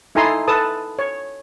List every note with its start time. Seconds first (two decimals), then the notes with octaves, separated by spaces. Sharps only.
0.15 D#4 E4 A4 G#5 A#5 C6
0.48 A4 B4 A5 D#6
0.99 C#5